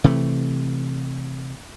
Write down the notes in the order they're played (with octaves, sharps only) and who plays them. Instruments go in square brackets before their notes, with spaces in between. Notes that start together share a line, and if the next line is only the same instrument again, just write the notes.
[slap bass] C3 E3 A3